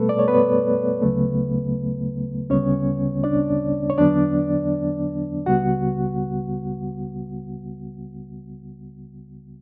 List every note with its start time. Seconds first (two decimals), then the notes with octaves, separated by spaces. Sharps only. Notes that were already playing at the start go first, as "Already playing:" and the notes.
Already playing: B2 G3 A3 B3 A4 B4
0.09 D5
0.19 C#5
0.28 B3 B4
1.02 D2 C#3 F#3 A3
2.50 D2 C#3 G3 B3 C#4 C#5
3.24 D4 D5
3.90 C#5
3.98 E2 D3 F#3 B3 D4 D5
5.46 C#2 C#3 G3 B3 F#4 F#5